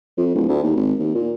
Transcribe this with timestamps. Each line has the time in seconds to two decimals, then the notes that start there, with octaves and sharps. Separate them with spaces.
0.17 F2
0.35 D1
0.49 D2
0.63 D#2
0.76 G#1
0.99 D#2
1.15 A#2